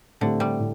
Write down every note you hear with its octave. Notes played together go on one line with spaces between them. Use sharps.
A2 D3 A3 C4 G4
G3
A2